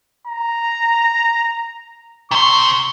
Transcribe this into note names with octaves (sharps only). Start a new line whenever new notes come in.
A#5
C3 C6 C#6